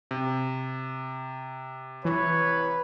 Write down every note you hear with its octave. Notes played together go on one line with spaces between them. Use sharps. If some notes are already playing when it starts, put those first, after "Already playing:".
C3
E3 B4 C#5